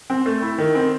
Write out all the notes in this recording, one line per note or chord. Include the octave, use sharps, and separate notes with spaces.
C4
A3
E4
D#3
C4